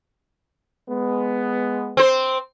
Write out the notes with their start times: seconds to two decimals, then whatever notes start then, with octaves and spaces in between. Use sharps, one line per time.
0.90 G#3 B3
1.97 C4 C5